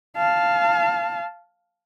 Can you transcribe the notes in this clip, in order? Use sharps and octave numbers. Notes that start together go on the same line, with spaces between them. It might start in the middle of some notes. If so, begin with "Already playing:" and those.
F5 A5